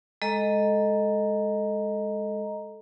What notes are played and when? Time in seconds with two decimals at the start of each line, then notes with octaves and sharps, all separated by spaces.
0.22 G#3 A4 D#5 A#5